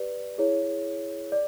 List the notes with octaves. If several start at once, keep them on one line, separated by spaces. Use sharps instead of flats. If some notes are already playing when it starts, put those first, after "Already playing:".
Already playing: G4 B4 D5
E4 G#4 C#5
D5